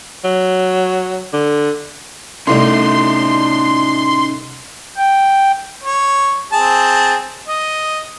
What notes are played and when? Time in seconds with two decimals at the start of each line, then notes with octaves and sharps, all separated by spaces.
0.24 F#3
1.33 D3
2.47 C2 A2 C#4 D#4 D#5 C6
4.97 G5
5.84 C#5
6.53 C4 G#4 A5
7.48 D#5